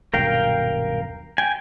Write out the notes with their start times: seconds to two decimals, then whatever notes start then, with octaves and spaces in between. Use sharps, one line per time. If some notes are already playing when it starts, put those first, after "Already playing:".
0.14 D#1 B1 G2 A#4 F5 G5
1.38 G5 G#5